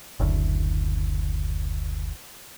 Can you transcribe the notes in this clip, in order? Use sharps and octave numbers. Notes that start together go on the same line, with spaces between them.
F#1 D2